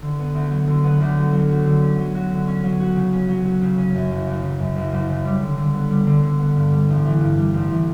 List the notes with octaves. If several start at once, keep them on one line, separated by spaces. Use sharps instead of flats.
D3
B3
D2
F#3
D3
B3
D2
F#3
F#3
F#4
D3
C#4
F#3
F#4
D3
C#4
F#3
F#4
C#3
C#4
F#3
F#4
C#3
C#4
F#2
F#1
F#1
C#3
F#2
F#1
F#1
C#3
G3
D3
D3
B3
G3
D3
D3
B3
G2
G3
A1
E3
G2
G3
A1
E3